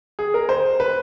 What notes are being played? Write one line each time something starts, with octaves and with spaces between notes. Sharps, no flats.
G#4
A#4
C5
B4